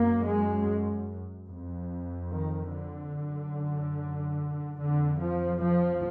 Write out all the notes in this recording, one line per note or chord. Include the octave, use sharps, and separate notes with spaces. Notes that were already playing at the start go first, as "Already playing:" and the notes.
Already playing: F#2 A#3
G#3
F2
D#3
D3
F#2
F2 D3
F3
F3